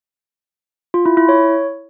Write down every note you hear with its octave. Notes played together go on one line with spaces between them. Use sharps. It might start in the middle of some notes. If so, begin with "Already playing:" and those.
F4
E4
E4
C#5